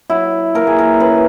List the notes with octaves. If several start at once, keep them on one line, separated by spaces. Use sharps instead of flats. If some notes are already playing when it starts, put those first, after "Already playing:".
F#3 E4
A#3 A#4
G#4
A#4
C#4 B4